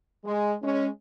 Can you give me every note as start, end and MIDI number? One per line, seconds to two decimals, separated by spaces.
0.24 0.54 56
0.63 0.87 56
0.63 0.87 61